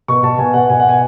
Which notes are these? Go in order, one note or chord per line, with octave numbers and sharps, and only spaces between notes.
B2 C#6
B2 A5
B2 G#5
B2 F#5
B2 G#5
F#5
B2 G#5